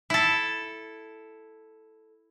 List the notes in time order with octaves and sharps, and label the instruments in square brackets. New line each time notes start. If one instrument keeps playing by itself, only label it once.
[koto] E4 A4